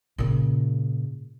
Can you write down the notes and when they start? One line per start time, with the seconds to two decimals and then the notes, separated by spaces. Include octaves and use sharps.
0.18 A#2 C#3